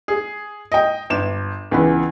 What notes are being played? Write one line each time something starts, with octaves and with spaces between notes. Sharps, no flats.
G#4
D#5 G5
G1 E7
C#2 E3 B3